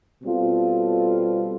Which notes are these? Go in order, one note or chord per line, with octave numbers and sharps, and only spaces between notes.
B2 G3 C4 F4 A4